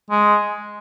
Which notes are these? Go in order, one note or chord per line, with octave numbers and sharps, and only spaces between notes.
G#3